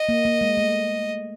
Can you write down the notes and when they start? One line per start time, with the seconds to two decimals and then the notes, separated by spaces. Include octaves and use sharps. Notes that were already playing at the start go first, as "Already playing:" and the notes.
Already playing: D#5
0.09 A#3
0.25 A#3
0.41 G#3
0.57 A3